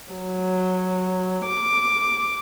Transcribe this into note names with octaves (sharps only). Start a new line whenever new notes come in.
F#3
D6